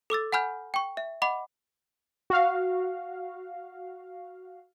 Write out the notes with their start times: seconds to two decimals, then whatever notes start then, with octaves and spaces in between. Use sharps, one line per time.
0.10 A4 D6 E6 A6
0.32 F#5 G#5 B5 F6 G6
0.74 G5 C#6
0.97 E5
1.22 D#5 F#5 B5 D6
2.30 F#4 F5